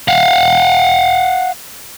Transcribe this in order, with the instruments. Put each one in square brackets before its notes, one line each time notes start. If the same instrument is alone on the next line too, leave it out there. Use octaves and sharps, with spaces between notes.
[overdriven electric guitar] F5 F#5